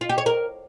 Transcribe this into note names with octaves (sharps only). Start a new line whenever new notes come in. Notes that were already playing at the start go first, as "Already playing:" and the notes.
F4
G4
C#5
A#4